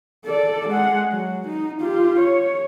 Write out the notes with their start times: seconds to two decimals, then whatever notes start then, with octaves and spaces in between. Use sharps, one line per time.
0.25 A4 D5
0.69 G#3 F#5
1.12 F#3
1.47 D#4
1.81 F4 G4
2.20 C#5